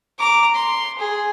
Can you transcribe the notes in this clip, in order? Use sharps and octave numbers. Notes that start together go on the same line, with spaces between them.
A#5 D6
C6
G#4